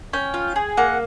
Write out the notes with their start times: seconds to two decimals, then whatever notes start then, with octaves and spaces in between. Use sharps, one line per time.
0.13 C#4 G5
0.34 F4
0.56 G#4
0.77 A#3 F#5